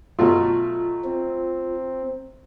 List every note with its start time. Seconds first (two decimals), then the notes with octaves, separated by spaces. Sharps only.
0.19 B2 F#3 A3 F4
1.04 C4